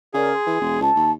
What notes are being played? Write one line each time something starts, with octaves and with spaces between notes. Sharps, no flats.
C#3 G#4 A#4 D5
C6
E3
E1 E4 C6
C#2 A5
D#2